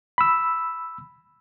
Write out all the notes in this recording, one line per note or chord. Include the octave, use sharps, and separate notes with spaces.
B5 E6